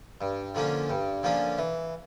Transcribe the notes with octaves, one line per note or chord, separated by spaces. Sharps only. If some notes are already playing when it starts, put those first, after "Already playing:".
G2
D3 F3 A#3 C#4
G2
D3 F3 A#3 C#4
E3